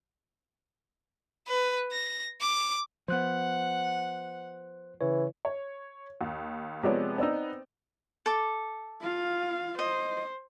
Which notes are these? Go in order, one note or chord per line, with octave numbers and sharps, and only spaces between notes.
B4
A#6
D6
F3 B3 C5 F#5 F#6
C#3 E3 C#5
C#5
D#2
C3 F3 G#3 B3 C#5 D5
B3 C4 D#4 D5 E6
A4 D6
F4 F5
C5 D#5